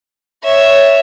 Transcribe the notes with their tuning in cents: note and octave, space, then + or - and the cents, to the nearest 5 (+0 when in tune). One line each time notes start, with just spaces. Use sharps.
C#5 +0 E5 +0